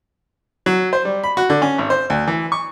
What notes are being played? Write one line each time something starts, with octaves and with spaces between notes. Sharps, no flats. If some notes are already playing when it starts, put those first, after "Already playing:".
F#3
C5
G3
B5
F#4
D3
C#4
G#1
C5
D2
E3
C#6